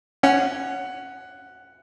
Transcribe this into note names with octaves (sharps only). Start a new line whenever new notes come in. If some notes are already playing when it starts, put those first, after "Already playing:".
C#4 F#5